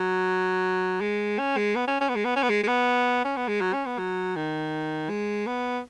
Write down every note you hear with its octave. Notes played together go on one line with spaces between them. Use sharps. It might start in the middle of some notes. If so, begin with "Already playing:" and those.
Already playing: F#3
G#3
C#4
G#3
B3
C#4
C#4
B3
G#3
B3
C#4
B3
G#3
G#3
B3
C#4
B3
G#3
F#3
C#4
B3
F#3
D#3
G#3
B3